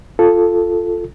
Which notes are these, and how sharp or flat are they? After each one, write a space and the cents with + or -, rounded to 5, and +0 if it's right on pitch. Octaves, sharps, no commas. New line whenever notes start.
F4 +0 A4 +0